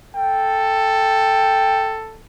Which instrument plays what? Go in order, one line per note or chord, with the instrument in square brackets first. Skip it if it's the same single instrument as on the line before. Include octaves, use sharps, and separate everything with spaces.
[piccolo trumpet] A4 [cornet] G5